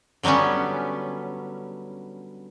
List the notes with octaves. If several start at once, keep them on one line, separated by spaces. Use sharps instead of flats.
D3 F#3 G3 B3 C#4